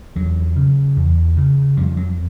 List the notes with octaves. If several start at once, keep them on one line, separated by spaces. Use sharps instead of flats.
E2 F#3
C#3
E2
C#3
F2 G3
F#3